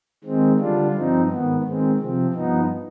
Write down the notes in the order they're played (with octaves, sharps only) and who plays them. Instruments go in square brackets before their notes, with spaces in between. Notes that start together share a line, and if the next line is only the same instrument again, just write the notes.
[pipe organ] D#3 G#3 C4
D3 G3 D4 F4
G2 F3 C4 D#4
G#2 D#3 B3
D#3 G#3 C4
C3 F3 C4
G2 F3 B3 D#4